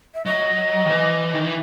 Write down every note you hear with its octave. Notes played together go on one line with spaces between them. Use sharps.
E5
F#3 D#5
D#3
E3
D#3
E3